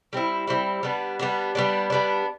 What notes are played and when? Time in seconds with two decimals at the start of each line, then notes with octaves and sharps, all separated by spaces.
0.13 G3 C4 E4
0.47 G3 C4 E4
0.83 G3 B3 D4
1.19 G3 B3 D4
1.55 G3 B3 D4
1.90 G3 B3 D4